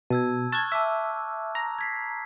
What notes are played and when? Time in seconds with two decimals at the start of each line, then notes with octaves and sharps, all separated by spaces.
0.10 B2 A5 E6 G#6
0.52 A5 C#6 F6 F#6 G#6
0.72 E5 A5 D6 E6
1.55 A#5
1.79 G#6 B6 C7